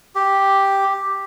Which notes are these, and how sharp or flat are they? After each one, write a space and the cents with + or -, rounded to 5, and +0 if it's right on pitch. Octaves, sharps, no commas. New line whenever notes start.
G4 +0